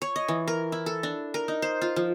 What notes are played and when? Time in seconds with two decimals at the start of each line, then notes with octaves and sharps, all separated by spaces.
0.02 C#5
0.16 D#5
0.28 E3
0.48 A#4
0.72 E4
0.86 A4
1.03 D4
1.34 A#4
1.48 D#4
1.62 C5
1.82 F4
1.96 F3